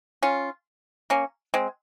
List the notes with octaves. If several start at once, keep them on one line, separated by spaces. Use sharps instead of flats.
C#4 F4
A#3 C#4
G#3 C4